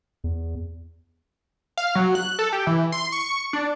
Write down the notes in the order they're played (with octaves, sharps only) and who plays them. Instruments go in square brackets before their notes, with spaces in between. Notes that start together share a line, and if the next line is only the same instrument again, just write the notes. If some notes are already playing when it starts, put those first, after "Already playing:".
[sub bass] E2
[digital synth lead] F5
F#3
F#6
A4
G4
E3
C6
C#6
D4